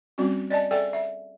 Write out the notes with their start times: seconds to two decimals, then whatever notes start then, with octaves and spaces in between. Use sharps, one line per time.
0.18 G3 C4 C#4 F#4
0.50 D5 D#5 G#5 A5
0.71 G#4 A4 D5 E5 G5 G#5
0.93 E5